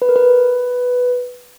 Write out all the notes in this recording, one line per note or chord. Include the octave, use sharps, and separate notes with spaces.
B4
A#4
B4